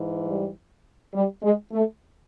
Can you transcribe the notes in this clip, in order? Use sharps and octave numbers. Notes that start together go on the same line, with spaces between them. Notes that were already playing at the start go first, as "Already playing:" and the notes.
Already playing: G#2 E3
G3
G3
G#3
A3